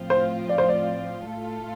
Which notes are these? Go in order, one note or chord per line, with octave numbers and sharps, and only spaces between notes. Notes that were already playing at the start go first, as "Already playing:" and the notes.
Already playing: A2 F3 C4 F4
C5
D5
C5
D5
A2 A3 F4 A4